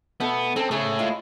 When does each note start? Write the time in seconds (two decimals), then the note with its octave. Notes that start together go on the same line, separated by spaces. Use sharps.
0.20 B2 A3 B3 A4
0.56 C4 C#4 A4
0.71 C#3 A3 G#4 C#5
0.99 G#3 E4 F4